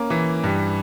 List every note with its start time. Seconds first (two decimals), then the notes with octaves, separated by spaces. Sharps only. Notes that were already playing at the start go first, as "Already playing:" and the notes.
Already playing: A#3 C#4
0.10 E3
0.44 G2